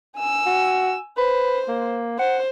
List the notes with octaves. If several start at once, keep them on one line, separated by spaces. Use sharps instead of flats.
G#5 E6
F#4
B4 C5
A#3
C5 F#5